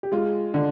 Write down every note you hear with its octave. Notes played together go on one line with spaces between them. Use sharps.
G4
G#3 F4
D3